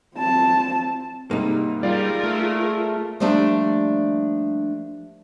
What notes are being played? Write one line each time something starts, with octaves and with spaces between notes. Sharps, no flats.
C4 A5
G#2 C3 G3 A#3 D#4
G3 F4 G#4 A#4 D5 F5 A6
A3
F3 G3 A3 A#3 D4 G4